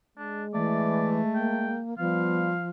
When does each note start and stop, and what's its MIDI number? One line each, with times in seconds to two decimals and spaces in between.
0.18 1.80 56
0.18 0.44 62
0.54 1.22 52
0.54 1.78 57
0.54 1.15 74
1.35 1.94 58
1.35 1.78 79
1.98 2.69 53
1.98 2.53 55
1.98 2.55 59
1.98 2.69 77